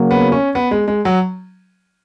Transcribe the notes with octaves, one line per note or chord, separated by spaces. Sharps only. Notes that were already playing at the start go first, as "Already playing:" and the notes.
Already playing: C#3 F#3 A#3
B3
C#4
B3
G#3
G#3
F#3